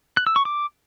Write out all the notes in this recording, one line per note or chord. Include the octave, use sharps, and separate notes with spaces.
F#6
E6
C#6
D6